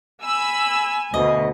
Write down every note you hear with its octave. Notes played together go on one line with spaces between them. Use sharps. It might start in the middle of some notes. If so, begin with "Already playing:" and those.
G#5 B5 E6
D2 B2 D#5